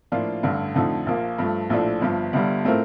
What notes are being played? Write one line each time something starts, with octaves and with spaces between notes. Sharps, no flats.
A2 F3 A#3 D4 F4
A1 G2 D3
F2 D3 F3 A3 D#4
A#1 A#2 F3 A#3
G2 F3 A3
A#1 A2 F3 A3 D4
G1 G2 F3
G1 G2 D3 G3
A2 A3 C4 F4 A#4